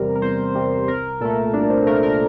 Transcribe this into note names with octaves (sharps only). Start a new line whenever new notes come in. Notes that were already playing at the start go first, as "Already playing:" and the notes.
Already playing: E2 C3 G3 A#4
A#4
E2 C5
C3 G3
C2 A#4
A#2 A3 A4
C2 D4
C5
A#2 A3 A#4
A#4